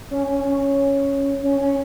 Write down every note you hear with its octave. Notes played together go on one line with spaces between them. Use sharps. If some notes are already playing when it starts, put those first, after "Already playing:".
C#4
C#4
C#4
C#4
C#4